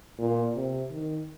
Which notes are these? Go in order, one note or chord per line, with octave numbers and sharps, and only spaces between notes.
A#2
C3
D#3